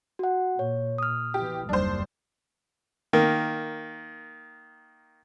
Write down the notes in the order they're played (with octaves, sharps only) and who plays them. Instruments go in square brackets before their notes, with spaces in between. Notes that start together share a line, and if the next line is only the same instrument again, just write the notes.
[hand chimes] F#4 F#5
[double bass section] A#2 [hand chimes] C#5
[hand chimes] D#6 F6
[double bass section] B2 E3 [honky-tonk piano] G4
[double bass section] F#1 D#2 G3 [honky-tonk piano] D4 C5
[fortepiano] D#3 A#3